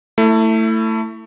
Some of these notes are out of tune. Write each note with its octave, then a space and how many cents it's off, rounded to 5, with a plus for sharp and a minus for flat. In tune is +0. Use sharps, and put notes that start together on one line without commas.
A3 +20 E4 +0